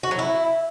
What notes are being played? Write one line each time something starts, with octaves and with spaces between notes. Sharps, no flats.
F#4
F#3
E4